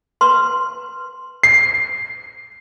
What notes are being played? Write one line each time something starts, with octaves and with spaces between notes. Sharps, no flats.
B4 C6
C7